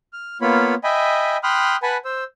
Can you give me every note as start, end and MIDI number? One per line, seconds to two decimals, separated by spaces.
0.13 0.38 89
0.41 0.75 58
0.41 0.75 59
0.41 0.75 65
0.41 0.75 73
0.41 0.75 83
0.84 1.37 75
0.84 1.37 76
0.84 1.37 79
0.84 1.37 80
0.84 1.37 83
1.43 1.76 79
1.43 1.76 83
1.43 1.76 84
1.43 1.76 87
1.43 1.76 89
1.43 1.76 90
1.83 1.97 71
1.83 1.97 78
1.83 1.97 80
1.83 1.97 81
1.83 1.97 83
2.05 2.24 72
2.05 2.24 88